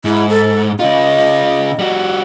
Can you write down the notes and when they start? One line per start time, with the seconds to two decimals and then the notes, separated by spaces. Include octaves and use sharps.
0.05 G#2 E4
0.29 A4
0.79 C#3 F4 D#5
1.79 G3 F#4